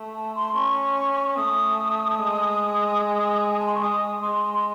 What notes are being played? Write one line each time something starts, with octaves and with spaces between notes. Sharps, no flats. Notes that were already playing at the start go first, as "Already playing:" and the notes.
Already playing: A3
A5
C6
C#4 C#6
A3 D#6
G#3
G#5
A5
C6
C#6
G#3 D#6
G#3 C6